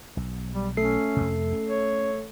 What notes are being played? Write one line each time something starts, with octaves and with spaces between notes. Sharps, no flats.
B1
G3
A3 C#4 A4 C7
F2 C3
C#4
C#5